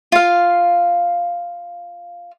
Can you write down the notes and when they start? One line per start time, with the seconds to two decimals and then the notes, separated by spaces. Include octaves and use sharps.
0.12 F4 F5